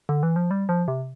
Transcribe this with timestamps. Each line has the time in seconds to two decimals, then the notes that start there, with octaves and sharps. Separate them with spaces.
0.09 D3
0.23 E3
0.36 F3
0.51 G3
0.69 F3
0.88 C3